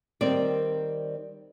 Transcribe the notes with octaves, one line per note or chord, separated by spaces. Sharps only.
D#3 G3 C4 A#4 C5 D5